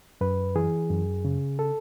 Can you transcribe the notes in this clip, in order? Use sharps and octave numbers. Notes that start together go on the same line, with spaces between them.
F#2 B4
E3 G#4
F#2
C#3
A4